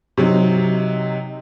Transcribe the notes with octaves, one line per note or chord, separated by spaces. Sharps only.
C3 F#3 D#4